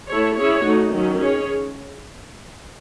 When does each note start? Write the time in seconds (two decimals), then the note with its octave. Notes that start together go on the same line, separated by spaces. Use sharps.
0.10 A3 E4 A4 C#5
0.38 C#4 E4 G#4 C#5
0.65 A3 D#4 F#4
0.94 D#3 F#3 C#4
1.22 C#4 G#4 C#5